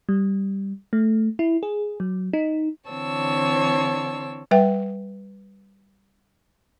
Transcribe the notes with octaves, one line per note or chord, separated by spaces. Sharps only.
G3
A3
E4
G#4
F#3
D#4
D3 E3 C4 C#5 A5 E6
G3 B4 E5 G5